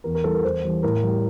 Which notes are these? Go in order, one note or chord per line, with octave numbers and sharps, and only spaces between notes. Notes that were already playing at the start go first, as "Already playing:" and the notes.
E2 A#4
A#4
E3 G3 A4
A#4
E2 C5
E3 G3
A2 A#4
G3